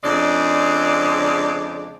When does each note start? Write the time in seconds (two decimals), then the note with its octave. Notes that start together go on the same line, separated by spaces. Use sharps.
0.04 F2 C#3 G#3 D4 D5